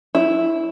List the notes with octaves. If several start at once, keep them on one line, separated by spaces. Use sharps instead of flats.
E4